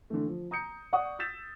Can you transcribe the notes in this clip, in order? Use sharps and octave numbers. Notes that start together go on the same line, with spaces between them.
D3 E3 A3
F3
A#5 D#6 G6 C#7
D5 F#5 C#6 D#6
E6 G6 A6 B6 E7